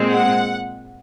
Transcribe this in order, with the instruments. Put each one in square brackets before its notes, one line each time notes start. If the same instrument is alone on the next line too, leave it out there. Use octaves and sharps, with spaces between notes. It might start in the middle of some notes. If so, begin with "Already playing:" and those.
Already playing: [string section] A#2 G#3 C4
F#5